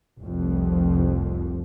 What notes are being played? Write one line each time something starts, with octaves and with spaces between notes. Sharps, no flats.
F1 C2 F2